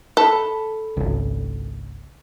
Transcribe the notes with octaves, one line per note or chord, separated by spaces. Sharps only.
A4 B5
G#1 C#2